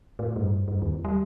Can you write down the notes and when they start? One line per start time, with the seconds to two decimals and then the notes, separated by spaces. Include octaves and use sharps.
0.19 A2
0.36 G2
0.68 G2
0.82 D#2
1.05 G3